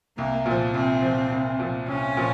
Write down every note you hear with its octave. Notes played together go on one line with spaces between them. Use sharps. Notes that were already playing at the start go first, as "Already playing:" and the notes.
C2 A#3
A#2 F3
C2 C4
A#2 F3
C2
A#2 F3
C2 C#4
A#2 F3